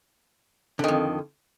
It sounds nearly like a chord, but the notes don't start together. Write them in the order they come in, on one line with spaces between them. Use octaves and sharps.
D3 D#3 F2